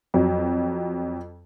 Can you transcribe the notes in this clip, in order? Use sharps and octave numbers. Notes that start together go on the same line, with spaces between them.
F2 F#3